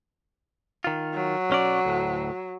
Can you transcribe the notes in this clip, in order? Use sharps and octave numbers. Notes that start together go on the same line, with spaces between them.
D#3 F4
F#3
B1 C#4 D5
D2 A2